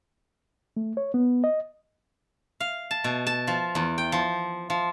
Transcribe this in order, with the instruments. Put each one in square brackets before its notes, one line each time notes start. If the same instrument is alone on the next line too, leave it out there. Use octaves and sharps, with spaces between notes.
[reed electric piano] A3
C#5
B3
D#5
[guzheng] F5
A5
B2
A5
F3
E2
G5
F3
F3